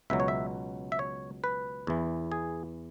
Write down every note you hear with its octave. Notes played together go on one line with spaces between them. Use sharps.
C#2 B2 F#3 E5
C#5
E5
E5
C#5
B4
E2 E3
G#4